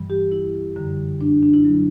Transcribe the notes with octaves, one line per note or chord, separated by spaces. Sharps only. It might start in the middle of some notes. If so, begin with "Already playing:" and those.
Already playing: G2 E3 G3
G4
E4
F#2 D3 G3
D4
D4
E4
D3 F#3